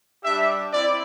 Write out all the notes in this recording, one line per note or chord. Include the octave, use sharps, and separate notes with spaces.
G3 D4 G4 E5
C4 E4 D5